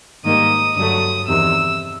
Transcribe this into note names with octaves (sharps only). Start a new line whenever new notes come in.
G#2 D#3 G3 A#3 D#4 D#6
G2 D3 F#3 A3 D#6
E2 C3 D#3 E6